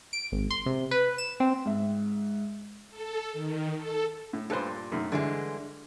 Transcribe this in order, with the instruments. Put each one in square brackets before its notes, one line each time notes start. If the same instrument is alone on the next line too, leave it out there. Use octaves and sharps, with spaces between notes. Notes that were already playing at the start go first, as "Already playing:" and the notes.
[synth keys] D7
G#1
C6
C3
B4
E7
C4
[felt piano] G#2 E5
[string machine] A4
D#3
A4
[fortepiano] A2
[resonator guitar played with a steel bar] G2 A#2 [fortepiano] A4 B4 C5
[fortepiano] F#2 D#3 A3
[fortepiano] G2 [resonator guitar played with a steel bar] D3 E3 G#3